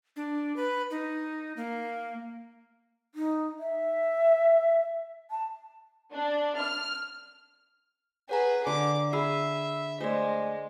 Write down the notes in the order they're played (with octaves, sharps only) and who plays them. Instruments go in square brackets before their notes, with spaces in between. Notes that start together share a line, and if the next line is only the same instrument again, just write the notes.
[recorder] D4
B4
D#4
A#3
[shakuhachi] D#4
E5
A5
[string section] D4
F6
[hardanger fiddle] G#4 B4 [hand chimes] C#5 F#5 A#5
[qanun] D3 [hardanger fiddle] D6
[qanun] G#4 [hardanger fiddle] E5 [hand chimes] B5 E6 C7
[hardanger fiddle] G#3 [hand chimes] A3 D5 [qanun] C5